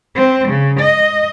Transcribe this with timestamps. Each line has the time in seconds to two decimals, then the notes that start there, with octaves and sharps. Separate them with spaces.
0.16 C4
0.49 C#3
0.80 D#5